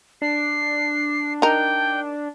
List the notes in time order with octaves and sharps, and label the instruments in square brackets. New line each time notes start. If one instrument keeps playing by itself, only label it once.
[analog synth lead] D4 [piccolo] C7
[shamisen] D#4 A#4 [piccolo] G5